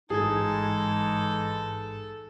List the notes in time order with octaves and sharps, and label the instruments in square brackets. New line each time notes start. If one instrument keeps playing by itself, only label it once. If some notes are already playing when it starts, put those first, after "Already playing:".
[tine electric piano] A1 G#2 G#6 [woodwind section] E3 G#3 D#4 [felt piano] G#4 [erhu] A4